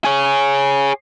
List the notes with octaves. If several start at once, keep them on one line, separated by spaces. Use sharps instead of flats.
G#4 C#5